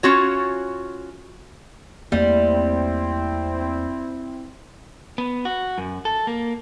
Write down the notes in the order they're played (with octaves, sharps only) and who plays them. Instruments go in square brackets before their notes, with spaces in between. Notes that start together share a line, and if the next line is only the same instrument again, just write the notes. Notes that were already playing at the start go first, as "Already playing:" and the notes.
[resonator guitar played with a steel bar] C#4 F4 F#4 C#5
[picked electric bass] E2 A3 A#3 [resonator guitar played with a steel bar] G3 [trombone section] C4 E4
[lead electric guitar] B3
F#4
F#2
A4
A#3